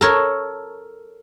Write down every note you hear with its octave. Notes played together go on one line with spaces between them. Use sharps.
A4 A#4 C#5